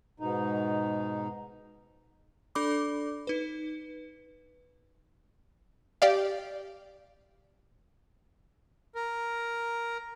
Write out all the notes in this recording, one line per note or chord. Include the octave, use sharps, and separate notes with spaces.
G#2 B2 D#4
D4 A4 D5 B5 D6
D#4 B4
G4 D5 F5
A#4